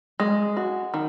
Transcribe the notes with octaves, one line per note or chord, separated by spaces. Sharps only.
G#3
F#4
D#3